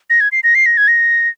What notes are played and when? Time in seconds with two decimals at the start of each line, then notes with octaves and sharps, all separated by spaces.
0.10 A#6
0.20 G#6
0.32 C7
0.44 A#6
0.55 C7
0.66 A#6
0.77 G#6
0.88 A#6